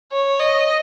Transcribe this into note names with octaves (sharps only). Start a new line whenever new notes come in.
C#5
D#5